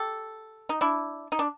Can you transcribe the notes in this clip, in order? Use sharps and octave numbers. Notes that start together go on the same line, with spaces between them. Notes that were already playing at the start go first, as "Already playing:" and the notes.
Already playing: G4 A4
D#4
D4 E4
D#4
D4